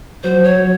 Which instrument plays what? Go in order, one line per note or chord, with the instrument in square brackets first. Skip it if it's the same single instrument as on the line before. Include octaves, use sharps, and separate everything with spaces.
[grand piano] F#3 [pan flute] C5
[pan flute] C#5
[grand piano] F#3